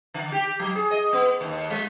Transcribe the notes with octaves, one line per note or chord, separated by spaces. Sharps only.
D3
G4
F#3
G#4
D#5
B3
D#2
G#3